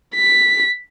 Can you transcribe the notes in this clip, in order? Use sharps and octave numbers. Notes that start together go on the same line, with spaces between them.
B6